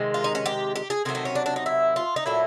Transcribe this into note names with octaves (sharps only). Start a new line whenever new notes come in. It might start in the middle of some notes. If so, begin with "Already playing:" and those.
Already playing: C3 D#3 G#3
F4
D#4
C#4
G4
G4
G#4
C3 D#3 F#3 A3 G#4
D#4
C#4
D4
D4
D#4
E4
F4
D#4
A#2 F#3 A3 E4